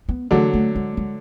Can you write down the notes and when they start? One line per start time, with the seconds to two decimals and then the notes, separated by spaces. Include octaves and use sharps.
0.09 B3
0.31 D3 F#3 A3
0.54 A3
0.76 G#3
0.97 G#3